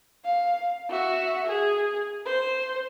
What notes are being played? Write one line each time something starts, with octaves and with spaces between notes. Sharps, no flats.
F5
F#4 E5
G#4
C5